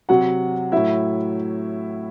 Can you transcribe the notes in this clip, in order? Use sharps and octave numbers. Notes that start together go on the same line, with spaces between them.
C3 F#3 F#4 F#5
A2 F#3 E4 E5